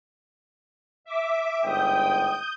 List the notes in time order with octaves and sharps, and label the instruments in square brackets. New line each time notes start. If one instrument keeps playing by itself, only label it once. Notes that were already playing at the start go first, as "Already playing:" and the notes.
[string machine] E5 D6
[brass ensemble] G1 G#2 G5 [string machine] D#6 G6